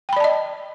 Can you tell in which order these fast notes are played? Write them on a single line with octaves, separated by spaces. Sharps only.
G5 B5 D5 A5 D#5